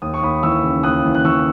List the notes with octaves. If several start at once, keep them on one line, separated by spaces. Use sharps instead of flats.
D#2 D#6
C#6
D#2 B5 D#6
E3 C#6 E6
C#3
D#2 D#6 F#6
E3
F#6
E3 C#6 E6